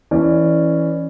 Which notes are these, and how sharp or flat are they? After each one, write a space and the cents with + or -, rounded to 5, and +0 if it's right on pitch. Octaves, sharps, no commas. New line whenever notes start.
E3 +0 C#4 +0 D5 +20